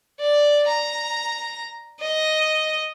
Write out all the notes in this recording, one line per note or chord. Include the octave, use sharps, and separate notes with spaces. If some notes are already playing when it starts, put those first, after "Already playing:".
D5
A#5
D#5